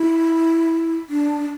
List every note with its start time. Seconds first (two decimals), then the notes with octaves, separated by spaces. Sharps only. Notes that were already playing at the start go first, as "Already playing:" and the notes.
Already playing: E4
1.09 D4